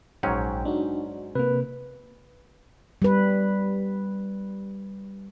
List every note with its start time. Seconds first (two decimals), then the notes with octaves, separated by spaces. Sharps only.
0.23 A#1 G#2 F#3 C#4 G5
0.65 D4 D#4 F#4
1.35 C3 A#3 B4
3.02 G3 B4